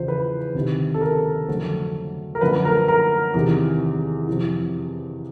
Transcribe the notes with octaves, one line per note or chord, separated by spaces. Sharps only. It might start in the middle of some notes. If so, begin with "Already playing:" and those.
Already playing: E2 C#3 F3 C5
B4
D2 C3 D#3
A4
A#4
F2 D3 F#3 A3 C4
A#4
F#2 D3 F3 A3 B4
A#4
A#4
E2 C3 D#3
F2 C3 E3